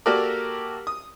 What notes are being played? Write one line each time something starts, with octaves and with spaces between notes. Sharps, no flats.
A#3 F#4 G4 A4 A#4 D5
D#6